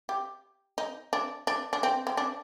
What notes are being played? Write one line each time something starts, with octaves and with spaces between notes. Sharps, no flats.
G4
D#4
D4
D4
D4
C4
C4
D4